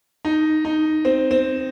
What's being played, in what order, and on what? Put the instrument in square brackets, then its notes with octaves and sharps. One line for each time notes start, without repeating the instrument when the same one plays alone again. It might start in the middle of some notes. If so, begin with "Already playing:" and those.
[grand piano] D#4
D#4
C4
C4